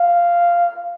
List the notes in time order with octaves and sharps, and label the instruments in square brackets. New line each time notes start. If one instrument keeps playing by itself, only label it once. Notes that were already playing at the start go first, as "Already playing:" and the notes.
Already playing: [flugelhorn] F5